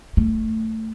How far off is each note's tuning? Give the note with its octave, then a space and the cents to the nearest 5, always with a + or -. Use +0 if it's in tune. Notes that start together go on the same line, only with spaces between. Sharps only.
A3 +10